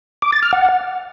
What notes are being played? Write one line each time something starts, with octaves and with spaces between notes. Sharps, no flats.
D6
A6
F6
F#5